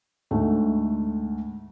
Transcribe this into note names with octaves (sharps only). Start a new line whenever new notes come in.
D2 G#2 A3